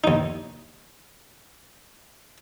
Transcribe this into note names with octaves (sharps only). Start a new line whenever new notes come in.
D#2 D#4